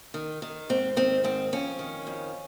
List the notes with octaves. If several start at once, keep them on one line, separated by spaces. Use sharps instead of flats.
D#3
D#3
G#2 C4
D#3 C4
G#2 C4
F2 C#4
D#3
F2